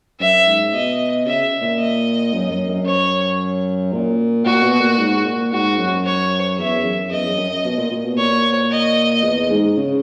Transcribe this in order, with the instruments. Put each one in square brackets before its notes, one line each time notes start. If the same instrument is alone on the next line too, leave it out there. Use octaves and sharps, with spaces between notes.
[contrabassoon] F#2 [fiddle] E5
[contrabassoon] G#2
[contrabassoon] B2 [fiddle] D#5
[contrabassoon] C#3 [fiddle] E5
[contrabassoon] A#2
[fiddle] D#5
[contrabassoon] F#2
F#2
F#2
[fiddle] C#5
[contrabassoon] A#2
[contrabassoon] A#2 [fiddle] F#4
[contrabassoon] B2
A#2
G#2
A#2
[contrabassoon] G#2 [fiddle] F#4
[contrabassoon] F#2
[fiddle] C#5
[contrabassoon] E2 [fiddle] E5
[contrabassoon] F#2
[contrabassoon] E2 [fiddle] D#5
[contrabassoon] F#2
F#2
B2
A#2
A#2
B2
[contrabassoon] A#2 [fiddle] C#5
[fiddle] D#5
[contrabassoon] E2
G#2
C#3